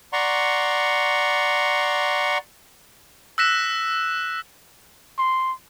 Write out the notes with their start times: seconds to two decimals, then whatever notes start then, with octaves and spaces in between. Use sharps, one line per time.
0.13 D5 F#5 A#5 C6 C#6
3.38 E6 F#6 A#6 B6 E7
5.19 C6